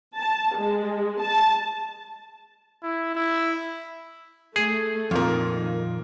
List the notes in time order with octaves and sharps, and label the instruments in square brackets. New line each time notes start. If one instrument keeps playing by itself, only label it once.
[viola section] A5
G#3
A5
[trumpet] E4
E4
[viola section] A3 [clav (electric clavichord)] G#4
[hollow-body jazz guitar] F2 A#2 [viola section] D#3 [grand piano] F4 A#4